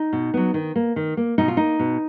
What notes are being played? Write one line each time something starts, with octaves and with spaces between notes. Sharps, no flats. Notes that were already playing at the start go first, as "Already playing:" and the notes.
Already playing: D#4
B2
F#3 B3
D#3
A#3
D#3
A#3
B2 D#4
F4
A#3 D#4
B2